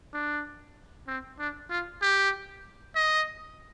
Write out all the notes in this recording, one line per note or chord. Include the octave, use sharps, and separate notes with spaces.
D4
C4
D4
F4
G4
D#5